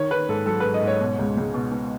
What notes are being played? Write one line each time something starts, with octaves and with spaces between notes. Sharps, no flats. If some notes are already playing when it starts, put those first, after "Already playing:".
Already playing: D#3 C#5
D#3 B4
G#2 A4
F#3 A4
G#2 B4
D#5
G#2
C#5
B2
C#2
C#2
B2
B2